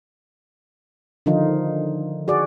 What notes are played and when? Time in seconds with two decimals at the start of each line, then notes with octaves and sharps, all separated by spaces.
1.26 D3 D#3 F3 D#4 F4
2.28 F#4 G#4 D5